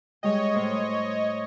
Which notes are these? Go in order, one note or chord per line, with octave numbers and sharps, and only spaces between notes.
G3 G#3 C#5 D#5 G5
A2 C5 B5
D#6